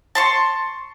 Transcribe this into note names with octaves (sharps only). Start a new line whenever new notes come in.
A5 C6 C#6